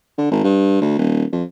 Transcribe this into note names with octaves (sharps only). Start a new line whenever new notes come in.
D3
G#1
G2
D2
D#1
F2